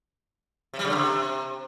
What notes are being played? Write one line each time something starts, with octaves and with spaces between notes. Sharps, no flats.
C3
G3
C#3
D3
C3